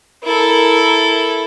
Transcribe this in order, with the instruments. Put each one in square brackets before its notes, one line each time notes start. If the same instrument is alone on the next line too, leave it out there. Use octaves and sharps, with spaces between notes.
[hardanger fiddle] E4 A4 [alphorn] A#4